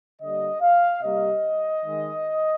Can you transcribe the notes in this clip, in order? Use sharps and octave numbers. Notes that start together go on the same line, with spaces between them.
D3 G3 A#3 D#5
F5
C3 G3 A#3 D#5
D#3 G#3